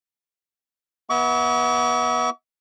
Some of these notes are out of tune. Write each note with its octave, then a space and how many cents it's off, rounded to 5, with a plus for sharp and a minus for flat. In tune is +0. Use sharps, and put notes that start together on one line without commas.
B3 -20 E5 -40 C#6 +40